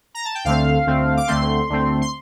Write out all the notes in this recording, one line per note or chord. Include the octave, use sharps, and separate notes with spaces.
A#5
A5
G5
D2 D3 A3 C4 F5
D2 D3 A3 C4
D6
D2 D3 A3 C4 C6
D2 D3 A3 C4
C6